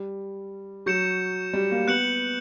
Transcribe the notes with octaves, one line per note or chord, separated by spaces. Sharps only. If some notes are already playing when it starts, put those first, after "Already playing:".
Already playing: G3
F#3 C#6 G6 C#7 E7
G3
A#3
B3 F#6 C#7 F#7